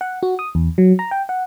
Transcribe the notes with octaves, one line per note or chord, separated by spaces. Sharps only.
F#5
F#4
D#6
E2
F#3
A#5
G5
F#5